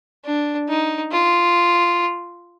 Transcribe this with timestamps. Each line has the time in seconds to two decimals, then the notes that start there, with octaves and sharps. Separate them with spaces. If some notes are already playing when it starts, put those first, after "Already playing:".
0.25 D4
0.69 D#4
1.12 F4